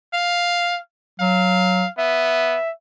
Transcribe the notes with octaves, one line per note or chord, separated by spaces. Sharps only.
F5
F#3 F5
B3 E5